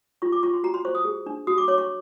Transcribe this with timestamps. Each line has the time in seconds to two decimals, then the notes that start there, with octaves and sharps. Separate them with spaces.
0.22 F4 C#6
0.32 D6
0.43 F4 C#6
0.53 C6
0.64 F#4 A#5
0.74 C6
0.85 C5 C#6
0.95 D#6
1.05 G#4
1.26 D4
1.47 F#4 D#6
1.58 D6
1.68 C#5 D6
1.78 C#6